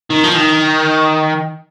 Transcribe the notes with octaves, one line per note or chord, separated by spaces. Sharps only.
D#3
F3
D#3